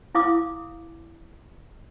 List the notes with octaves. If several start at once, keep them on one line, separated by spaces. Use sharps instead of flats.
E4 F5 D6 D#6